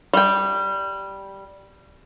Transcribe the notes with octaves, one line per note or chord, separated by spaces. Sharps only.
G3 G5